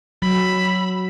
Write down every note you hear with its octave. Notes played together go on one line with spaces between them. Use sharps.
F#3 B5 E6